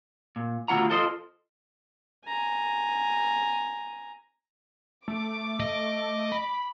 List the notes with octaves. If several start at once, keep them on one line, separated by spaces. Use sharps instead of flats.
A#2
D2 B2 A3 F4 F#5 A#5
F4 A4 C5 D#5
G#5 A#5
A3 D6
D#5
B5